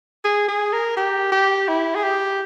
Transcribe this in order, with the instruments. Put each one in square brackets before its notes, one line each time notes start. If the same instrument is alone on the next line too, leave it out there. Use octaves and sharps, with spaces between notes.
[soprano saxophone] G#4
G#4
A#4
G4
G4
E4
G#4
G4